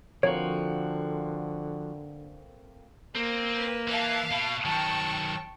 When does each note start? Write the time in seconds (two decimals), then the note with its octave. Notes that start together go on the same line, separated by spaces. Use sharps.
0.23 D3 F3 A3 A#3 C4 F#4 C#5
3.16 A#3 C4
3.56 B4
3.88 E3 E5 F5 A5
4.32 B2
4.65 D#3 F#3 G5 A5 C#6